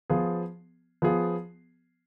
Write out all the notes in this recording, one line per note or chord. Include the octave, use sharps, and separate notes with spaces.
F3 B3 F4 G#4
F3 B3 F4 G#4